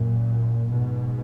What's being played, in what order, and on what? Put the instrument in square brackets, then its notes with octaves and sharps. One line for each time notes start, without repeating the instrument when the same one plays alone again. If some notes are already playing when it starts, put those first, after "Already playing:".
Already playing: [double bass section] F#2 A#2
G#2 B2